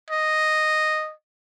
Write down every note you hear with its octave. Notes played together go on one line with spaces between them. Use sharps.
D#5